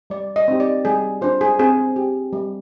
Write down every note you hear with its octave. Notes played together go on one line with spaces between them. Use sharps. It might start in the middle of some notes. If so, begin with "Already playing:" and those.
G3 D5
D#5
C4 D#4 G4
D5
G3 G#4
D4 F4 C5
G#4
C4 G#4
G4
G3